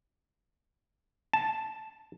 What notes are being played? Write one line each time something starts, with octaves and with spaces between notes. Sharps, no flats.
A5